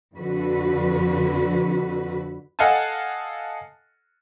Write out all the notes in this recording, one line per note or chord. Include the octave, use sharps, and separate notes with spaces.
F2 D3 F#4 B4
A4 D#5 F5 F#5 G#5 A5